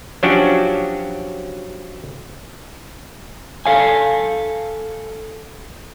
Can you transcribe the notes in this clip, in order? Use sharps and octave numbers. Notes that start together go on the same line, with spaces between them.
F3 F#3 C#4 D4 F#4 G4
A4 F5 G#5